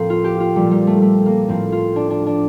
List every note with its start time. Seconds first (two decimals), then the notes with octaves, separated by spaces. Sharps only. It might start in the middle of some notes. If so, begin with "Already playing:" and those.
Already playing: A2 F3 A#3 C4
0.10 F4
0.24 G4
0.40 F4
0.55 A#2 F3 G3
0.71 G3
0.87 A3
1.02 A3
1.26 A#3
1.49 A2 F3 C4
1.72 F4
1.96 D4
2.10 D4
2.26 D4